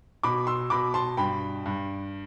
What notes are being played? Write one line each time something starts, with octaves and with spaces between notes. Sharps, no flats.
B2 B5 D6
C6 E6
B2 B5 D6
A5 C6
G2 G5 B5
G2